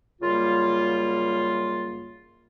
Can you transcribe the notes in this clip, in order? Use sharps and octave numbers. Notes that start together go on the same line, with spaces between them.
F#2 C#3 G3 A#3 F4